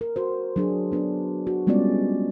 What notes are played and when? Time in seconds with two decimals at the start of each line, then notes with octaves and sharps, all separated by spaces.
0.01 A#4
0.16 F#4 C5
0.56 F#3 D4 G#4
0.92 B3 D4 B4
1.47 F#4
1.67 G3 G#3 B3 C#4 F4 D5